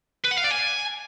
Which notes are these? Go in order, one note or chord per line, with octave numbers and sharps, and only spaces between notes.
B4
F#5
F5
D5
G#5